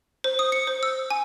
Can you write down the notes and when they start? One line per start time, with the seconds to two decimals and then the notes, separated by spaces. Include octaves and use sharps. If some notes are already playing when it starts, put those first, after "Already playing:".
0.24 C5
0.39 D#6
0.52 C#7
0.67 C5
0.83 E6
1.10 G#5